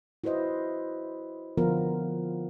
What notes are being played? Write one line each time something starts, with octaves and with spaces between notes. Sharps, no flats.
E4 F#4 B4 C5 D#5
D3 F3 B3 F4 A#4